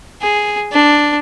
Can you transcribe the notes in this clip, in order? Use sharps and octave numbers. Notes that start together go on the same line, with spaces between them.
G#4
D4